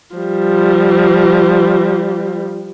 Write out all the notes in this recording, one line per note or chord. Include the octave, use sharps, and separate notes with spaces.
F3 G3